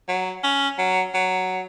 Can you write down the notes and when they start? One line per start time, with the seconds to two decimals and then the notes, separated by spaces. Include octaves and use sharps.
0.08 F#3
0.44 C#4
0.78 F#3
1.14 F#3